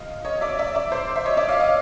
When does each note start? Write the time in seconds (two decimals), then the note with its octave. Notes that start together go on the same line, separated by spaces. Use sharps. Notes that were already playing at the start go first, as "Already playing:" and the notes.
Already playing: D#5 F5
0.25 C#5 D#5
0.41 D5 E5
0.59 D5 E5
0.75 D5 E5
0.92 C5 D5
1.16 E5
1.26 C#5 D#5
1.37 D5 E5
1.49 D#5 F5
1.60 D#5 F5